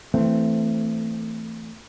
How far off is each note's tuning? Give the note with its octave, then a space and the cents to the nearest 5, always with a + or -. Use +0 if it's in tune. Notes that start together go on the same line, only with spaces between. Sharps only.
E3 +0 A3 +20 C4 +0